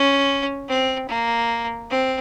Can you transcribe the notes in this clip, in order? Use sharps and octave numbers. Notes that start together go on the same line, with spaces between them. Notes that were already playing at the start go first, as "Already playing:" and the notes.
Already playing: C#4
C4
A#3
C4